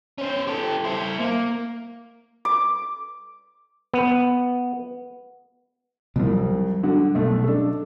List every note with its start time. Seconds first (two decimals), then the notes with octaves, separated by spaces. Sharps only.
0.18 C#4 C5
0.48 G4 A4
0.85 E4 C5
1.20 A#3
2.45 D6
3.94 B3
6.16 C2 F2 C3 F#3 G3
6.83 D3 F#4
7.15 B1 A3
7.44 D4 A4